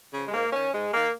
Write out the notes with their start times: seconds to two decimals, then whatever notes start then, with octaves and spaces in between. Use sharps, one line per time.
0.13 C#3 F3
0.28 G#3
0.33 G#2 A#3
0.53 D#3 C#4
0.73 G#2 G#3
0.93 D#3 A#3